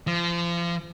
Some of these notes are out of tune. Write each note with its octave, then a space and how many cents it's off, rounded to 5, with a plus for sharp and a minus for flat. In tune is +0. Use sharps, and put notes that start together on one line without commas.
F3 -30